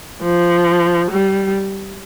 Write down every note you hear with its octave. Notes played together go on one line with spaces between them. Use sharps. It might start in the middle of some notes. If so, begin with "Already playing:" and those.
F3
G3